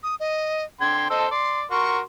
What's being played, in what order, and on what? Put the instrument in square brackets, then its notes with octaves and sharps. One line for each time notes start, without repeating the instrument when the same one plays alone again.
[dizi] D#6
D#5
[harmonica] D3 G5 C6 [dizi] G#6
[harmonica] A4 C5 E6 [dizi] D#5
[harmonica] D5 [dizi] C6
[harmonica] F#4 A#4 C6 [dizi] C#6